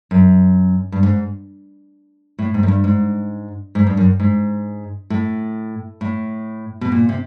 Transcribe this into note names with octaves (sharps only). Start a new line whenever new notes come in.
F#2
G2
G#2
A2
G#2
F#2
G2
G#2
G#2
G2
F#2
G#2
A2
A2
B2
A#2
C3